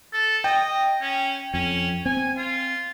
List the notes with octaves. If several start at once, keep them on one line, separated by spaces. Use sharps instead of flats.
A4
D#5 G5
C#4
F2 C#4
C4 G#5
F4